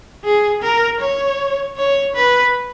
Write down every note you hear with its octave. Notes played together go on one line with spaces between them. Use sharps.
G#4
A#4
C#5
C#5
B4